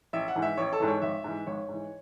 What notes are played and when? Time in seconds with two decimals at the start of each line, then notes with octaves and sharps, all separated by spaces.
0.13 A1 E5
0.28 F#5
0.36 G#2 E3
0.42 E5
0.57 A1 C#5
0.73 A4
0.80 G#2 E3
0.88 C#5
1.02 G#1 E5
1.24 G#2 E3
1.47 G#1 C#5
1.69 G#2 E3